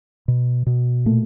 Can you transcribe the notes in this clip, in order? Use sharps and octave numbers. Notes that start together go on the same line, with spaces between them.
B2
B2
A#2 A3